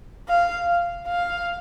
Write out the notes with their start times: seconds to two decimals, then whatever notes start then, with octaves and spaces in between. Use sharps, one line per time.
0.28 F5
1.08 F5